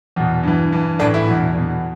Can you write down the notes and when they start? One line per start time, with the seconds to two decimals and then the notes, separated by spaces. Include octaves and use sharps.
0.16 E2 B2
0.43 G2 E3
0.72 G2 E3
0.99 A2 E3 D4
1.14 E4
1.27 E2 B2
1.56 E2 B2